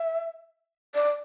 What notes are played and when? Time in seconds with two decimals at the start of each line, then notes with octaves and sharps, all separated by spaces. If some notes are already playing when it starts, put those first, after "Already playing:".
Already playing: E5
0.95 D5